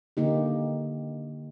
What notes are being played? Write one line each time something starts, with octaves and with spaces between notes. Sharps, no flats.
D3 A#3 D#4 G4